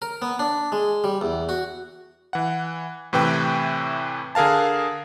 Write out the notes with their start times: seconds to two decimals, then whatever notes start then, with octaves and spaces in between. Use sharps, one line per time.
0.02 A#4
0.22 B3
0.39 D4
0.72 G#3
1.04 G3
1.21 E2
1.49 F#4
2.33 E3 F#5
3.13 A2 C3 E3 B4 G5
4.35 D3 G#4 A#4 F5 A5